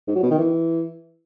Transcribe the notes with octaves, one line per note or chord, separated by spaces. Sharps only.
G#2
F#3
B2
D#3
E3